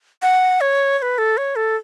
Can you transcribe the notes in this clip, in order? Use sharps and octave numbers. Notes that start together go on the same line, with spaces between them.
F#5
C#5
C#5
B4
A4
C#5
A4